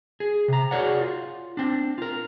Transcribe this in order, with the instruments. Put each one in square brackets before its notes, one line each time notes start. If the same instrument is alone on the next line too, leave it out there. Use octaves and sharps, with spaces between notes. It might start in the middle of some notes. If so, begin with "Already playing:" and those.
[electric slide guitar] G#4
C3 A#5
F#4 G#4 A#4 C#5 D5 F#5
F4
C4 D4
F4 A#4